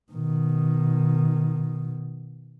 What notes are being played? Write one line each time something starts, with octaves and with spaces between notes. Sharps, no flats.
B2 D#3